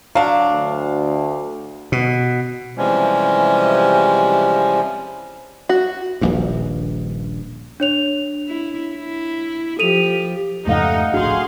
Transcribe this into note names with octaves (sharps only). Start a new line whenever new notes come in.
F#3 D4 F5
D2
B2
C3 E3 F3 G3 G#3 C#4
F#4
D#1 A#1 G2
D4 C#5 F7
E4
E4
F3 G4 A4 D#7 F7
F2 G#2 C#3 A3 D#4 F5 F#5
D1 A#1 D4 F#4 G#4 F5 C6